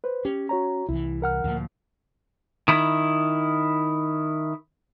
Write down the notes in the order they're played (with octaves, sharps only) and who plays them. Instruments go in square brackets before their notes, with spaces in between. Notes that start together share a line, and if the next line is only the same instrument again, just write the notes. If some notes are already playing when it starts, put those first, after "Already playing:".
[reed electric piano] B4 C5
[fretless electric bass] C#4 [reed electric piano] G4
[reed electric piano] F#4 C#5 A#5
[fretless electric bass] C2 E3 [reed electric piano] E4
[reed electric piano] A#4 F#5 F6
[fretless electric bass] D2 A#2 F3
[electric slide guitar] D#3 E4